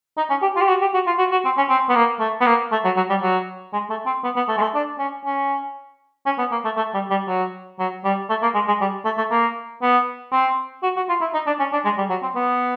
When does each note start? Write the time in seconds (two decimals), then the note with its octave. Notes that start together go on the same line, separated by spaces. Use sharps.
0.17 D#4
0.30 C#4
0.42 G4
0.56 F4
0.61 G4
0.68 F#4
0.81 G4
0.94 F#4
1.07 F4
1.19 F#4
1.32 F#4
1.45 C4
1.57 C#4
1.69 C4
1.89 B3
1.96 A#3
2.20 A3
2.41 B3
2.46 A#3
2.72 A3
2.84 F#3
2.96 F#3
3.10 G3
3.22 F#3
3.73 G#3
3.90 A3
4.06 C4
4.24 B3
4.36 B3
4.48 A3
4.57 G#3
4.62 A3
4.75 D4
4.99 C#4
5.25 C#4
6.26 C#4
6.39 B3
6.51 A#3
6.65 A3
6.77 A3
6.94 G3
7.10 G3
7.28 F#3
7.79 F#3
8.04 G3
8.30 A3
8.42 A#3
8.54 G#3
8.68 G#3
8.81 G3
9.05 A3
9.18 A3
9.31 A#3
9.82 B3
10.32 C4
10.83 F#4
10.96 F#4
11.09 F4
11.21 E4
11.33 D#4
11.47 D4
11.59 C#4
11.73 D4
11.85 G#3
11.98 G3
12.10 F#3
12.22 C4
12.36 B3